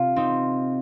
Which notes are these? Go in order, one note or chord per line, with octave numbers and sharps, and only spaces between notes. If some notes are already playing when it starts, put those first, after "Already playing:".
Already playing: C3 F4
C4 D#4